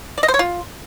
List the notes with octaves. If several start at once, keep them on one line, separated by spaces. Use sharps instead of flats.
D5
D#5
C5
C#5
F4